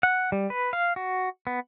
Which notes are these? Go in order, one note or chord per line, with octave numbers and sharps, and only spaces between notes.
F#5
G3
B4
F5
F#4
B3